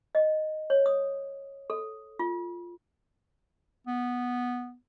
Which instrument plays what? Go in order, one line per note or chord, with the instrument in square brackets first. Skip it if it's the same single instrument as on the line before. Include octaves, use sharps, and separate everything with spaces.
[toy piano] D#5
C#5
D#6
A4
F4
[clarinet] B3